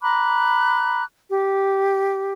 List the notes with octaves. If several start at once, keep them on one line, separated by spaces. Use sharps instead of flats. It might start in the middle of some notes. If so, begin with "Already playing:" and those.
A#5 B5 D6 F#6
G4